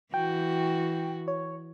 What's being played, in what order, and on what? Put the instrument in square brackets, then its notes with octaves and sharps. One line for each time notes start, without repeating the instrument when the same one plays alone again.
[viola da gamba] E3 F#4 [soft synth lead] G5
[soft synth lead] C#5